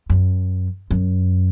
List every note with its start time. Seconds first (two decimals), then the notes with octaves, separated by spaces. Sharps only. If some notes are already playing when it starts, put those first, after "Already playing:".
0.10 F#2
0.90 F#2